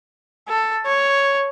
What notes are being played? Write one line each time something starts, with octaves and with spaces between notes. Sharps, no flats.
A4
C#5